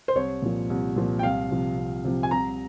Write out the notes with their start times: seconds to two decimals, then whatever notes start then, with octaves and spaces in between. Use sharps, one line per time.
0.08 C5
0.15 C2 C#5
0.42 A#2 F3
0.70 C2
0.96 A#2 F3
1.19 G5
1.23 C2 F5
1.51 C3 F3
1.77 C2
2.04 C3 F3
2.23 G#5
2.31 C2 A#5